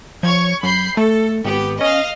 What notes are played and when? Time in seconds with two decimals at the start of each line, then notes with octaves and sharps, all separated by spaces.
0.23 F3 C#5 C#6 G#6
0.63 F#2 B5 G6 C7
0.97 A3 A4
1.45 G#1 B3 G4
1.81 C#4 D#5 F5